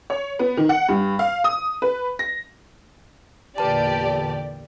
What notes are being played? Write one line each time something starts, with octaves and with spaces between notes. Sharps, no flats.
C#5
B3
D#3
F#5
G2
F5
D#6
B4
A#6
E2 A#2 D3 G4 B4 D5 A5